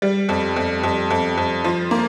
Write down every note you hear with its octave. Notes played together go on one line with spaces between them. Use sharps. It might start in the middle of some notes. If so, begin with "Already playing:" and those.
G3
F2
F2
F2
F2
F2
F3
A#3